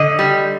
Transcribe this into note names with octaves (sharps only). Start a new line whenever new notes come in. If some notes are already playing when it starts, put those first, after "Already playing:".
Already playing: D3 D#5
G3